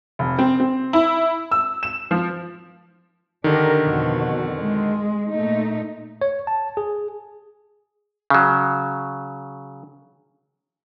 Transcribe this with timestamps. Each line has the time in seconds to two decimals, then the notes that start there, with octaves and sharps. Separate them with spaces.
0.19 F1
0.38 C4
0.60 C4
0.93 E4
1.52 E6
1.83 E7
2.11 F3
3.44 D3 D#3 D4 G4 A#4
3.83 F2 B2 F#4
4.58 G#3
5.30 A#2 A3 D#4
6.21 C#5
6.47 A5
6.77 G#4
8.30 C#3 F#3